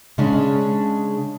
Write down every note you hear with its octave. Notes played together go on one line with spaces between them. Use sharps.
C#3 G#3 C#4 D4